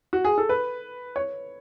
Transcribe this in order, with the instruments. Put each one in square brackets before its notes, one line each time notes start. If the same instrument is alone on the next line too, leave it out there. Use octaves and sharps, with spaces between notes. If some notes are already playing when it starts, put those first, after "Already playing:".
[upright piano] F#4
G#4
A4
B4
C#5